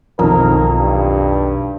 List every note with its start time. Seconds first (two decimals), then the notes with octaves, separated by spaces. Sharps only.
0.19 B1 F2 D#3 A#4
0.78 G2